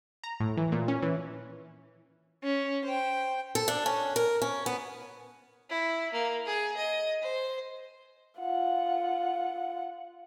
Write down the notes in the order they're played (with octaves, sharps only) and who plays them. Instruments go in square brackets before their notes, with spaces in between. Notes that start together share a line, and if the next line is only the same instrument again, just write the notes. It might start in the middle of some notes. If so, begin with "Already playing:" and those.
[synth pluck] A#5
A2
E3
A#2
C#4
E3
[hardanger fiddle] C#4
C5 G5
[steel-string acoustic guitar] A4
D4
C#4
A#4
C#4
B3
[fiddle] E4
A#3
G#4
D#5
C5
[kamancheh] F4 F#5